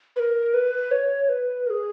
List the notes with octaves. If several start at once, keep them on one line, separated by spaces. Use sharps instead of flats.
B4
A#4
B4
C#5
B4
A#4
G#4